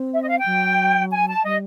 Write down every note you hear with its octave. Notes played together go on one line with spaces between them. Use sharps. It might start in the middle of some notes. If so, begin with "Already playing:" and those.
Already playing: C4
E5
D#5
F5
G5
F#3
G#5
A5
G3 D#5